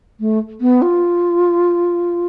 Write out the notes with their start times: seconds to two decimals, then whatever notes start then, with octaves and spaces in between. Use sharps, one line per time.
0.20 A3
0.61 B3
0.82 F4